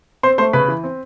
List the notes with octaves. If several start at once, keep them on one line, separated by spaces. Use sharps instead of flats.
C4 C5 C6
A3 C5 C6
C#3 B4 B5
E3
C4